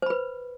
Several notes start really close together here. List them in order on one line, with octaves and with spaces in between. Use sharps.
C5 B5 B4